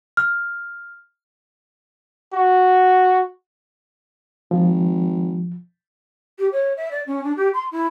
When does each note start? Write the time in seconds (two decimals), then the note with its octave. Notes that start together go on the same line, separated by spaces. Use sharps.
0.17 F6
2.34 F#4
4.51 G#1 F3
6.39 G4
6.52 C#5
6.77 E5
6.91 D5
7.07 C#4
7.23 D4
7.36 G4
7.54 C6
7.72 E4